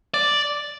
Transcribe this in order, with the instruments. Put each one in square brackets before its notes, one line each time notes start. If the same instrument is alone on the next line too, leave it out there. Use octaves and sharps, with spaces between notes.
[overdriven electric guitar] D5